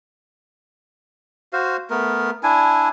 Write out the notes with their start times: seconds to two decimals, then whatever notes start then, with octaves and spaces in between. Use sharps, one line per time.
1.53 F#4 C5 F5
1.90 A3 B3 A#4
2.43 D4 E4 G#5